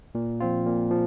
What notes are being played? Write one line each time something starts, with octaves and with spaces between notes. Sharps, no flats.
A#2
F3 C4 F4
A#2
F3